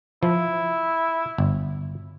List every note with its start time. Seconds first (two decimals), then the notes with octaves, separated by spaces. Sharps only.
0.23 F3 E4
1.38 G1